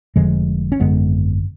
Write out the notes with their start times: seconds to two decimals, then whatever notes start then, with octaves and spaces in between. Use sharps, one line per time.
0.16 F1 F2 D3 F3 G#3
0.72 C#4
0.80 G#1 F#2 D3 G#3 B3